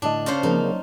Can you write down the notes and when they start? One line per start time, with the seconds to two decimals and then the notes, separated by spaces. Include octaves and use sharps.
0.02 A2 D3 D4 D#5
0.26 C#3 F4 C5
0.43 C#3 F3 A#3 C4 D#4
0.63 F#3